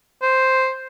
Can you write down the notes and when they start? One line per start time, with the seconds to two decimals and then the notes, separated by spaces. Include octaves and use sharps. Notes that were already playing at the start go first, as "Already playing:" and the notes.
0.22 C5